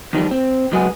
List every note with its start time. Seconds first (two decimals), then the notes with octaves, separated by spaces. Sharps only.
0.13 E2 D#3 F3 G3
0.31 C4
0.72 C#2 F#2 F#3 G#3 B3 G#4